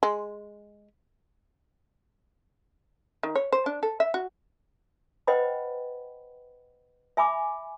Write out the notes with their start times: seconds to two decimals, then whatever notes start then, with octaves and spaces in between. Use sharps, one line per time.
0.03 G#3
3.23 D#3
3.36 C#5
3.52 C5
3.66 D4
3.83 A4
4.00 E5
4.14 F#4
5.27 B4 C5 D#5 F#5 G5 B5
7.17 E5 G#5 B5 D6